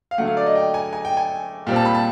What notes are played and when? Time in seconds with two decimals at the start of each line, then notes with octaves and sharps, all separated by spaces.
0.11 F5
0.18 D3 F#3 A3 F#5
0.27 F5
0.37 D5
0.46 D#5
0.55 G5
0.74 G#5
0.93 G#5
1.05 G5
1.17 G#5
1.67 A#2 G3 C4
1.76 A5
1.85 B5
1.95 A5